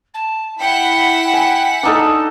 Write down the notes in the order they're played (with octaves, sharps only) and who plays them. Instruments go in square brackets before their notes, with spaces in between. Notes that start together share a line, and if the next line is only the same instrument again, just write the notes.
[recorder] A5
[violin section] E4 F#5 B6 [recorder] G5
[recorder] G5 [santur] G#5
[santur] D4 D#4 A4 [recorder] A5